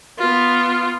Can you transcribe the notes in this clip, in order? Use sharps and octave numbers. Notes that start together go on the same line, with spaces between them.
B3 F4